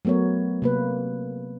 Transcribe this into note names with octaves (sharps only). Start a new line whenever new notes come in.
F#3 A3 B3 A#4 C#5
C3 A#3 B4